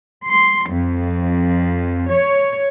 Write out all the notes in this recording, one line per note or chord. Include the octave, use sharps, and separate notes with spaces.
C6
F2
C#5